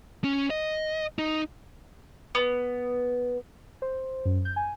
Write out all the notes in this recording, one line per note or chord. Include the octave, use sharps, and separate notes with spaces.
C#4
D#5
D#4
B3
C5
F#2
G6
G#5